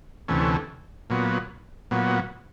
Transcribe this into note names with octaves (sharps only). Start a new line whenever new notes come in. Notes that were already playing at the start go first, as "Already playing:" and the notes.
D2 C3 E3 A3 C#4
A#2 F#3 B3
A#2 F#3 B3